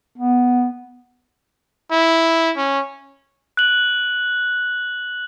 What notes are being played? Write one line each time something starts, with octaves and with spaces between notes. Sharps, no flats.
B3
E4
C#4
F#6 F#7